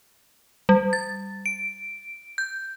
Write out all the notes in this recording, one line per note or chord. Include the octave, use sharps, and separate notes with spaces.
G3
A6
D7
G6